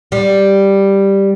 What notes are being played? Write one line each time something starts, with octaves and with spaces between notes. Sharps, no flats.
G3